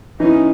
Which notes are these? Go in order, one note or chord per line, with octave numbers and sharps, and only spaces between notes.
E3 C#4 D#4